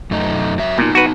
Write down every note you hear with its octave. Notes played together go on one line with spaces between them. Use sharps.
F#2 A3 D#4
F#3 E5
A#2 B3 D#4
F#4 B4